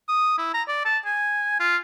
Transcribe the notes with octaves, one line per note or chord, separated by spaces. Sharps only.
D#6
E4
A#5
D5
A5
G#5
F4